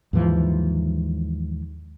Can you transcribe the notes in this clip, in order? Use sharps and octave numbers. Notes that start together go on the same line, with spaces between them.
D#2 G#2 E3 F3